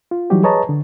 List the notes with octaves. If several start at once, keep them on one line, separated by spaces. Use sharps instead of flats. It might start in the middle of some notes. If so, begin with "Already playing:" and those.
F4
E3 F#3 G3 D#4 F#4 G4
G#4 B4 C#5 D#5 A5 A#5
D3